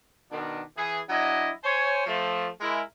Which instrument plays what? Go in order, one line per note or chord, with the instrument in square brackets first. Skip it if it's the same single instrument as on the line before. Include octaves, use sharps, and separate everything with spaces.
[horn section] B2 D#3 D4
E3 G#4
F#3 D4 E4 D#5
C5 C#5 G#5
F3 A3
G#3 E4 A#4